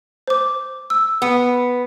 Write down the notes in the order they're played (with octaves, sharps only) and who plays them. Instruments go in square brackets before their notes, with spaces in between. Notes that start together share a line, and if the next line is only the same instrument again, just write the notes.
[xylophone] C5 D6
E6
[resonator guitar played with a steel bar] B3